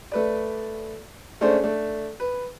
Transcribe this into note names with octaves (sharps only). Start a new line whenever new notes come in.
A3 B4 D5
G#3 A3 C#4 D4 C5 D5
A3 D4
B4